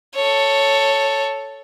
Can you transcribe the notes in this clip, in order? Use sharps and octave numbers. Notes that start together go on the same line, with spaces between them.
A4 C#5